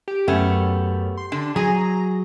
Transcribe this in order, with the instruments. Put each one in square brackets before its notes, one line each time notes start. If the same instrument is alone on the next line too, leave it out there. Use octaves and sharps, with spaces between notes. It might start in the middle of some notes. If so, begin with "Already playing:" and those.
[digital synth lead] G4
[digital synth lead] F#2 [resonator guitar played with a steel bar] A3 B3 C#4 [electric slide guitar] G4
[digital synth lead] C6
[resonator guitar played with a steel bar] D3 D4
[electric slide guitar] F#3 [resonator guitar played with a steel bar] G#4 G#5 [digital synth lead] A#5